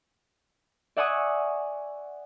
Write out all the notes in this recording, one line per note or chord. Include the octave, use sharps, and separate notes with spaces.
D5 E5 F#5 G#5 C#6 D#6